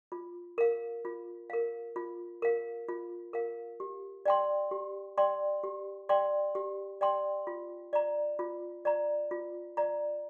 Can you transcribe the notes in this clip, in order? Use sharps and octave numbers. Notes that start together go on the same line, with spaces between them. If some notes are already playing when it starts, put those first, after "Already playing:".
F4
A#4 F5
F4
A#4 F5
F4
A#4 F5
F4
A#4 F5
G4
D5 G5 C6
G4
D5 G5 C6
G4
D5 G5 C6
G4
D5 G5 C6
F4
D5 A#5
F4
D5 A#5
F4
D5 A#5